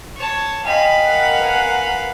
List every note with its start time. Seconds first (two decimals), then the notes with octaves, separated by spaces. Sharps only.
0.16 C#5 A5
0.65 D#5 F5 G5 G#5 B5
1.00 A#4 F#5
1.41 B4 G#5